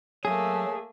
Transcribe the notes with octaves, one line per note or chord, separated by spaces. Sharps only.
F#3 A3 A#3 G#4